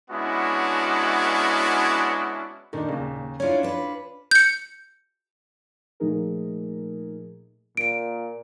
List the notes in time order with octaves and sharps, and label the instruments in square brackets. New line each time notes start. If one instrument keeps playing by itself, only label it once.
[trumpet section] G#3 B3 C#4 D4 E4 F#4
[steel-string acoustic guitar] A#2 [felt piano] D#3 D4 D#4
[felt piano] D#2 C#3
[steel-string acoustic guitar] C#4 D4 E4 [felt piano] F4 C#5
[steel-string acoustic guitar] D4 B4
[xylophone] G6 C#7
[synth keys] A#2 F3 A3 D#4 G#4 A#4
[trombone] A#2 [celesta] D7